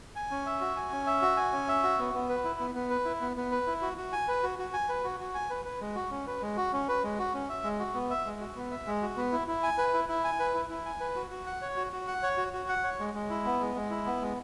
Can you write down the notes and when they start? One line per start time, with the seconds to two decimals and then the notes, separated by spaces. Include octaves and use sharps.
0.16 G#5
0.31 C#4
0.46 E5
0.61 F#4
0.76 G#5
0.92 C#4
1.07 E5
1.22 F#4
1.37 G#5
1.53 C#4
1.68 E5
1.83 F#4
1.99 B3
2.14 B3
2.29 B4
2.44 E4
2.60 B3
2.75 B3
2.90 B4
3.05 E4
3.21 B3
3.37 B3
3.51 B4
3.67 E4
3.82 F#4
3.97 F#4
4.12 G#5
4.28 B4
4.43 F#4
4.59 F#4
4.73 G#5
4.89 B4
5.04 F#4
5.20 F#4
5.34 G#5
5.50 B4
5.65 B4
5.81 G#3
5.95 F#4
6.11 C#4
6.27 B4
6.42 G#3
6.57 F#4
6.73 C#4
6.88 B4
7.03 G#3
7.18 F#4
7.34 C#4
7.49 E5
7.64 G#3
7.80 F#4
7.94 B3
8.10 E5
8.26 G#3
8.40 F#4
8.56 B3
8.71 E5
8.87 G#3
9.02 F#4
9.17 B3
9.32 E4
9.48 E4
9.63 G#5
9.78 B4
9.94 E4
10.09 E4
10.24 G#5
10.39 B4
10.54 E4
10.70 E4
10.86 G#5
11.00 B4
11.16 F#4
11.30 F#4
11.46 F#5
11.62 C#5
11.77 F#4
11.93 F#4
12.08 F#5
12.23 C#5
12.37 F#4
12.53 F#4
12.69 F#5
12.84 C#5
12.99 G#3
13.14 G#3
13.30 E4
13.45 B3
13.60 G#3
13.76 G#3
13.91 E4
14.06 B3
14.21 G#3